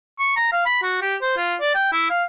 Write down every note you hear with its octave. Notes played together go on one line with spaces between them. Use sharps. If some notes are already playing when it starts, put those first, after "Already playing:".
C#6
A#5
F5
B5
F#4
G4
C5
F4
D5
G5
E4
F5